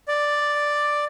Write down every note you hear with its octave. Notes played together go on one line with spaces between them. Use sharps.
D5